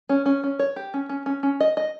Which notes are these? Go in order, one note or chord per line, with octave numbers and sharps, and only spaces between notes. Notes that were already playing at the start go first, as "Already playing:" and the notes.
C#4
C#4
C#4
C#5
G4
C#4
C#4
C#4
C#4
D#5
D#5